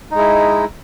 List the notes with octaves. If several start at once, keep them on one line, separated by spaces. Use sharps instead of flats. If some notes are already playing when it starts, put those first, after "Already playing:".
G#3 D#4 E4